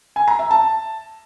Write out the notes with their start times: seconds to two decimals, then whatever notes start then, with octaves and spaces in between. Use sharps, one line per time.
0.16 G#5
0.28 A#5
0.39 E5
0.51 A5